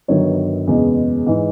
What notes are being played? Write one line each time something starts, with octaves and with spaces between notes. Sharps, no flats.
G1 G2 D#3 F#3 C#5
F#1 E2 B2 G#3
G#2 E3